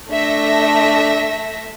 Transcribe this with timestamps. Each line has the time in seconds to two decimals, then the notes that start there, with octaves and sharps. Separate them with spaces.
0.11 A3 D4 E5 A#6